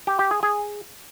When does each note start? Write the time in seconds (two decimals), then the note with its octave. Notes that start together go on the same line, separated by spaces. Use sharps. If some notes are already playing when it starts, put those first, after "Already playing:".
0.07 G4
0.19 G4
0.31 G#4
0.43 G#4